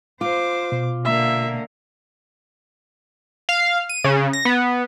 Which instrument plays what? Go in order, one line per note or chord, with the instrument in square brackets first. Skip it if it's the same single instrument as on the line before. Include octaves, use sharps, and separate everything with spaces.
[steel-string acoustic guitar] F4 [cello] C5 [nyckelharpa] D6
[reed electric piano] B2
[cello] D3 A#3 [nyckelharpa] E5
[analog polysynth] F5
D#7
C#3
A#6
B3